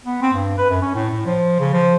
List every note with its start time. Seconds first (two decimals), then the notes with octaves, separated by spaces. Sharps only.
0.05 B3
0.22 C4
0.34 G2
0.58 B4
0.70 F#2
0.82 C#4
0.95 A2
1.10 A2
1.25 F3
1.59 C#3
1.73 F3